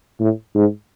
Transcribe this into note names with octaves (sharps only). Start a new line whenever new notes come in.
A2
G#2